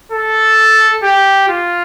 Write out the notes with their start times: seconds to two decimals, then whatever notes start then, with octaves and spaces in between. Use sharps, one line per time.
0.12 A4
1.04 G4
1.49 F4